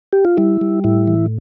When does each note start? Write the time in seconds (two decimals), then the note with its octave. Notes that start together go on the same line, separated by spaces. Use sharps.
0.13 G4
0.25 F4
0.37 G3 E4
0.61 G3
0.84 A2 E4
1.07 E3